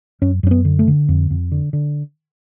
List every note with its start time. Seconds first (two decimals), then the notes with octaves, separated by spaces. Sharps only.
0.22 F#2 C#4
0.43 F#2 C#4
0.51 B3
0.65 D3
0.79 A3
0.87 D3
1.09 F2
1.30 F2
1.52 D3
1.73 D3